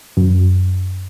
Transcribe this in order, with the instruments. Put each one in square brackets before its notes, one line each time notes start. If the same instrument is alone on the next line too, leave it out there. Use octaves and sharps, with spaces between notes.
[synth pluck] F#2